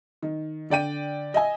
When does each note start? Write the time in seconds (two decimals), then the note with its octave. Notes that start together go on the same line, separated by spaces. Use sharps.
0.22 D#3
0.70 D3 D5 G5 D#7
1.34 D#5 E5 G#5